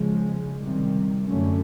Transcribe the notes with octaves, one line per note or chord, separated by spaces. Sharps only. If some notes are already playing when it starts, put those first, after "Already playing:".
Already playing: C#3 F3 G#3
C3 D#3 G3
F#2 D3 F#3 A3 C#4